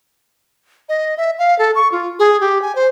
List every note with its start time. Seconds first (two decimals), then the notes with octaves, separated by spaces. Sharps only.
0.89 D#5
1.17 E5
1.39 F5
1.59 A4
1.75 C#6
1.92 F4
2.19 G#4
2.41 G4
2.62 G#5
2.75 C5